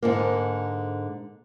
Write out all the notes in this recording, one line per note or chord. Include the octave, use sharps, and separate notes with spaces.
G#2 D3 A#3